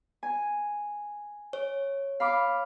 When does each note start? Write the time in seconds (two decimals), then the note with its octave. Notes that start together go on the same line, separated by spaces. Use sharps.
0.23 G#5
1.53 C#5
2.20 F5 B5 D6